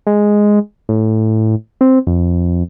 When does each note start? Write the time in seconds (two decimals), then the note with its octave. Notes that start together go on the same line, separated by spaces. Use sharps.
0.07 G#3
0.89 A2
1.81 C4
2.07 F2